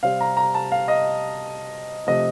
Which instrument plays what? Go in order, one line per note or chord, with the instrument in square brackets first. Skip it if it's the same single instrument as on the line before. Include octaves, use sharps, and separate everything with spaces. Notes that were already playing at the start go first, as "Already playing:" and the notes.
[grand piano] C3 G3 C4 F5
A#5
A#5
A5
F5
D#5
C3 F3 A3 D#5